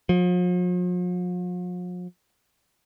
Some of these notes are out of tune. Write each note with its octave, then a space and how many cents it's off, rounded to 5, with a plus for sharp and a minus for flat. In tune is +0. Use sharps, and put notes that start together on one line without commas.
F3 +45